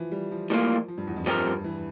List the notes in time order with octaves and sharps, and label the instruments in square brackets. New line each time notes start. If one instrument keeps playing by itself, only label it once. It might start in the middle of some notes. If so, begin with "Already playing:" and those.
Already playing: [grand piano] E3 F3
G3
F3
[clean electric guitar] A2 G3 A#3 F4 [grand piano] F3
[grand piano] F3
G2
E2
F2
[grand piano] G2 [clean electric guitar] F3 C4 G4 A#4
[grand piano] G2
E3